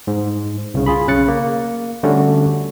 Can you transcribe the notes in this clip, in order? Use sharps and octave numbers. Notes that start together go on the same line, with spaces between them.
G#2
C2 C#3
F4 G#4 B5
B1 C#3 F#6 A6 C#7
A#3
D3 G3 A3 C#4 D4 F#4